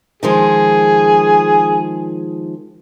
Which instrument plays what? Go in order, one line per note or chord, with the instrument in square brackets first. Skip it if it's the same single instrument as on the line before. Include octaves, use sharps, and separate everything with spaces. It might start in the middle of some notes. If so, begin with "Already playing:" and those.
[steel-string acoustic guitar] D#3 F3 G#3 [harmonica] G#4